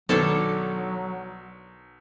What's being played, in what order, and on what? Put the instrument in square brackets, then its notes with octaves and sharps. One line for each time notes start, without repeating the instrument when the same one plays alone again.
[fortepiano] B1 D#3 [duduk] F#3 [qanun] D4 A4 C#5